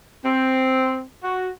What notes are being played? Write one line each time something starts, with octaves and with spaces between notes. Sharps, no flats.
C4
F#4